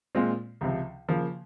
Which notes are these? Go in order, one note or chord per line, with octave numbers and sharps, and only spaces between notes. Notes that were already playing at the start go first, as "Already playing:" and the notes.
A#2 G#3 C4 F4
C#2 C3 F3
C#3 F3 A#3